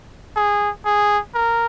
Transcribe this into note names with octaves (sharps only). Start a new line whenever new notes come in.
G#4
G#4
A#4